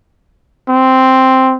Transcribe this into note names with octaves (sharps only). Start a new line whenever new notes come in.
C4